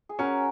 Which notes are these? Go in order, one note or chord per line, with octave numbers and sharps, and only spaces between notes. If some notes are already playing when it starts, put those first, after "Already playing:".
G#4
C#4 F#4 A#4